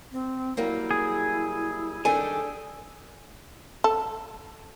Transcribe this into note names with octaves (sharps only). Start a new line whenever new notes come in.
C4
F#3 G3 A#3 E4
G#4
D#3 G3 D4 A4 G#5
A4